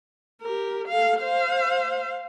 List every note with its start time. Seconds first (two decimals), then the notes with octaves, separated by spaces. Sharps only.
0.42 G4 A#4
0.87 A4 F5
1.20 C5 F5